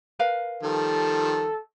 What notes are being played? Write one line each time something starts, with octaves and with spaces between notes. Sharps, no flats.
A#4 B4 F5
D#3 F3 G3 A4